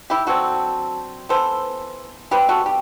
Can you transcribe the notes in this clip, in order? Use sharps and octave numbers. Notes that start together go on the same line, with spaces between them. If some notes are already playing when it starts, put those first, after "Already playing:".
E4 G4
D3 F#3 C4 F#4 A4
E3 B3 A4 C5
C3 G3 C4 G4 B4
F#4 A4
G4